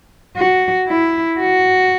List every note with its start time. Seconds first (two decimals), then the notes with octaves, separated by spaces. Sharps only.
0.37 F#4
0.87 E4
1.39 F#4